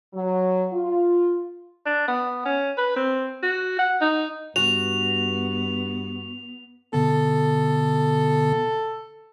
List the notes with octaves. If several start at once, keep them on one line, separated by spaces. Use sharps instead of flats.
F#3
F4
D4
B3
C#4
B4
C4
F#4
F#5
D#4
G2 B3 F#4 F7
B2 D3 B3 A4